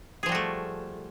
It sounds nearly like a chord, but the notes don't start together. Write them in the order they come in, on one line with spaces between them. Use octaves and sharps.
G#4 F3 G3 F#4 A3